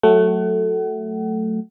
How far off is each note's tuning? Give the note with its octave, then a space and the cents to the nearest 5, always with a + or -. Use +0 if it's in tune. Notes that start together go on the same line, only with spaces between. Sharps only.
F#3 -10 A3 +0 F#5 +35